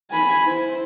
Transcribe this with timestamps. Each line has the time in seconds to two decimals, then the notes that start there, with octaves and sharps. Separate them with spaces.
0.11 G#5 B5
0.44 E4 C5